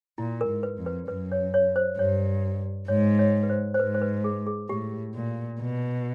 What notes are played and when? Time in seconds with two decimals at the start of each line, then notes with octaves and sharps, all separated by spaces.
0.18 A#2 E4
0.41 A#4
0.48 G#2
0.63 B4
0.78 F2
0.86 B4
1.08 F#2 B4
1.32 C#5
1.54 C#5
1.76 C5
1.99 G2 C#5
2.88 G#2 C#5
3.19 C#5
3.43 B4
3.49 C5
3.74 C5
3.79 G#2 B4
3.95 C5
4.02 B4
4.24 G#4
4.47 G#4
4.69 A2 G4
5.14 A#2
5.59 B2